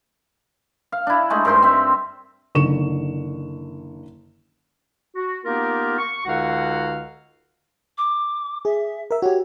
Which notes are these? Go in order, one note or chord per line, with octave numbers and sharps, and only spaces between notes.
F5
D4 E4
G#3 A3 D#4
G2 A#4 C5 C6
C4 E5
F#1 D3 D#3 C#6 E7
F#4
A#3 B3 D#4 F4 G4 A#4
C#6
C#2 D3 D#4 F#4 F5 F#5
D6
G#4 E5
A#4 E5
F#4 G4 C#5